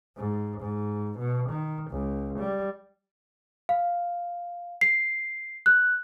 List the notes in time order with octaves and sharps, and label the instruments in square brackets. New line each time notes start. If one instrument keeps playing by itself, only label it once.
[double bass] G#2
G#2
B2
D#3
C#2
G3
[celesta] F5
C7
F#6